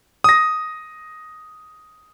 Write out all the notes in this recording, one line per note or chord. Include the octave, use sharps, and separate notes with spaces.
D#6 A#6